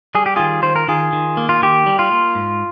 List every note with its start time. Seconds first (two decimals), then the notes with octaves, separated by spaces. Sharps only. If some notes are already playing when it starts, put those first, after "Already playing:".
0.15 G3 G#4
0.26 G4
0.36 D#3 F4 G#4
0.63 D#3 C5
0.76 A#4
0.88 D#3 F4 G#4
1.13 D#3
1.37 A#3
1.49 F4
1.62 D#3 G4
1.86 G3
1.99 F4
2.12 A#3
2.35 G#2